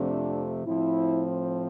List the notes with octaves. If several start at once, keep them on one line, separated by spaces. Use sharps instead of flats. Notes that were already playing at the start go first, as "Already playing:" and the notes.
Already playing: F2 C3 F3 A3 C4 D4
A2 F3 C4 E4